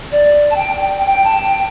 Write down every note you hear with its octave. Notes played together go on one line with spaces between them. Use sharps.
D5
A5
G5
G5
G5
A5
G5